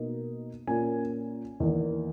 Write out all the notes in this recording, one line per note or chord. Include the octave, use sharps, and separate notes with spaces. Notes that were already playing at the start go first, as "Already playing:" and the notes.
Already playing: B2 A#3 D#4
A#2 A#3 C#4 G#5
E2 D#3 A#3 D#4